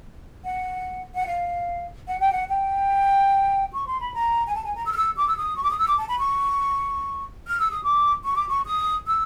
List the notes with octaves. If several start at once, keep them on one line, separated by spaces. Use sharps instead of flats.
F#5
F#5
F5
F#5
G5
F#5
G5
C#6
C6
B5
A#5
G#5
A5
G#5
A#5
E6
F6
E6
D6
E6
D#6
C#6
D6
D#6
E6
D6
A5
B5
C#6
F6
E6
D#6
D6
C#6
D6
C#6
D#6
E6